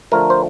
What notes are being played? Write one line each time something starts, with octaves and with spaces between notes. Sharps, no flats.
D3 F3 A3 A#4
C5